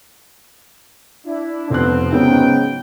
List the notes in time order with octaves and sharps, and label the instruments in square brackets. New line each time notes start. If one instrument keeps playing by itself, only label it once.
[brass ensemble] D4 E4
[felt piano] F1 F#6 [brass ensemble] F3 B3 C4
[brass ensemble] G#2 F#3 G5 [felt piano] C#3 B3